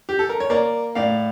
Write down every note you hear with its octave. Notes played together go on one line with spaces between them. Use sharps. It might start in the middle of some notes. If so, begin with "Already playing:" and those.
G4
A4
A#4
C#5
A#3 A#4 D5
A2 D5 F5